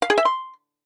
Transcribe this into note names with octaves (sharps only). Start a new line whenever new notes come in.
F5
G#4
E5
C6